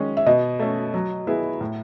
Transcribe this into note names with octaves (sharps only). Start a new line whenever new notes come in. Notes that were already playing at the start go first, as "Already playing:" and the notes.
Already playing: D#3 G#3 C#4
E5
B2 D#5
A3 C#4
F#3
B3 E4 G#4
A2